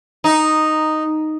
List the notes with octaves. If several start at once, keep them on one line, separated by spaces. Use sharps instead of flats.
D#4